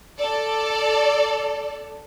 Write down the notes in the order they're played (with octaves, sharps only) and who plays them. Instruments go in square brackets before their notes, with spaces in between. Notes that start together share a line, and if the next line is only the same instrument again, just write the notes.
[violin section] A4 D5